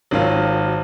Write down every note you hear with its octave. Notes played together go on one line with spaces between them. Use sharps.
G#1 D#3 F#3 F4